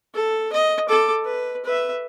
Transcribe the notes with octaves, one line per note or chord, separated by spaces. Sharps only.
A4
D#5
A4 D6
B4
B4 E5